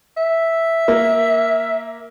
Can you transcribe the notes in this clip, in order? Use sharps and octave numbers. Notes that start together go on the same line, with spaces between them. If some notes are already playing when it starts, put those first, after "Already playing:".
E5
A#3